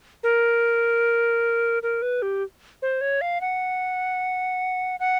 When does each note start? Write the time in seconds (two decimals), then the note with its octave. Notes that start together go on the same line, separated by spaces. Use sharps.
0.23 A#4
1.83 A#4
2.02 B4
2.22 G4
2.82 C5
3.01 C#5
3.21 F5
3.41 F#5
5.00 F#5